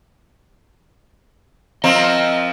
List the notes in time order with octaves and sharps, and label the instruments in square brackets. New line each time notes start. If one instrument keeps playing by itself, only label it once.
[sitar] F3 C4 A#4 [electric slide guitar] D#5